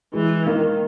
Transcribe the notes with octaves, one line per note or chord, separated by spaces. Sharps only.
E3 G#3
D#3 A#3